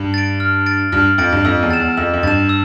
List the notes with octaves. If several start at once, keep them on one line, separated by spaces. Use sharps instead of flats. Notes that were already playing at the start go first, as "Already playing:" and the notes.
Already playing: G2
A6 D7
F6
A6 D7
G2 F6
F2 A6 D7
G2
F2 E6
E2
A6 E7
E2
F2 E6
F2
G2 A6 E7
E6